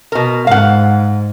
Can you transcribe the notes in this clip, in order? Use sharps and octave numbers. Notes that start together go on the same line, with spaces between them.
B2 A#4
G#2 F5 F#5